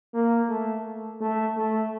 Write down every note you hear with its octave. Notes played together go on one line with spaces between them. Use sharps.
A#3
A3
A3
A3